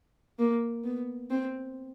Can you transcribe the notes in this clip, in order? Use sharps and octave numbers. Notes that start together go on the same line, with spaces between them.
A#3
B3
C4